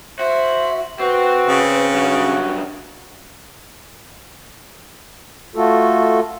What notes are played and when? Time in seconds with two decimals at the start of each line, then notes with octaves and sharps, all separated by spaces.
0.19 F#4 C5 E5
1.00 C4 F#4 B4
1.48 C#3
1.94 G2 F#3 F#4
5.56 A3 F4 F#4 A4